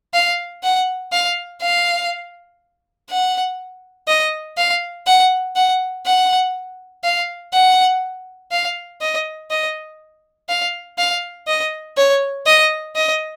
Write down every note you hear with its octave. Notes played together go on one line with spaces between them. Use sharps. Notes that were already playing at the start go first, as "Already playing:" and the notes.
F5
F#5
F5
F5
F#5
D#5
F5
F#5
F#5
F#5
F5
F#5
F5
D#5
D#5
F5
F5
D#5
C#5
D#5
D#5